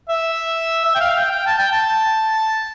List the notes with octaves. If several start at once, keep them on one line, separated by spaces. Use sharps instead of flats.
E5
E5
G5
F5
F5
G5
G5
A5
G5
A5